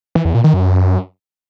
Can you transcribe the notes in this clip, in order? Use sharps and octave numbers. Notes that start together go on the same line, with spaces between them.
E3
E2
A#2
D#3
F#2